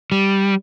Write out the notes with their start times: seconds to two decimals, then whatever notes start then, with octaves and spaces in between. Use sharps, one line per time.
0.12 G3